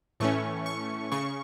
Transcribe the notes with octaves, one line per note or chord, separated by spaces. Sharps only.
A2 E3 A3 C#4 C#6
C#6
C#3 C#6